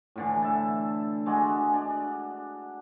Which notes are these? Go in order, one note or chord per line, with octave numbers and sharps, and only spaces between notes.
A2 D3 E3
E5 A5
G#3 D4 F#4 G#4
D4